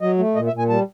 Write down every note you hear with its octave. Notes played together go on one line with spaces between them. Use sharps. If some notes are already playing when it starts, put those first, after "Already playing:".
F#3 D#5
A3
A#2 D#5
E5
A#2
G#5
G3 A5